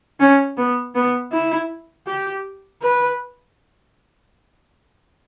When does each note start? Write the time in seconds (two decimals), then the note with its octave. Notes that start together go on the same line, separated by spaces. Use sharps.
0.20 C#4
0.57 B3
0.95 B3
1.32 E4
2.07 G4
2.82 B4